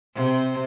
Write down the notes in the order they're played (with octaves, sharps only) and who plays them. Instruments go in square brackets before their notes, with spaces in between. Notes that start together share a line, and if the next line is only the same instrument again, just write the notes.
[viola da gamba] C3